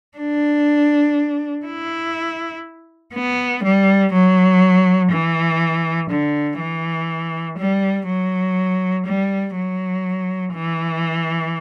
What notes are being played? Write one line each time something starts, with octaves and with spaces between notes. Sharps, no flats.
D4
E4
B3
G3
F#3
E3
D3
E3
G3
F#3
G3
F#3
E3